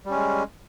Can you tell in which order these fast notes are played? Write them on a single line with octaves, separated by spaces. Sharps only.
G3 C#4 G#3